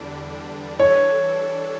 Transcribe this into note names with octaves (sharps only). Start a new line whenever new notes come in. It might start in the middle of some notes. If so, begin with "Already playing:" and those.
Already playing: E2 D3 G3 D4
E3 G3 D4 A4 C#5